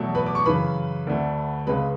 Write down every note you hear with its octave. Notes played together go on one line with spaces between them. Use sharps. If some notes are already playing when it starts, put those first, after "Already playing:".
Already playing: E2 B2 F#3 A3
B4 B5
D6
C#6
F#2 C#3 E3 B4 B5
D2 D3 A3
C#2 C#3 G#3 B4 B5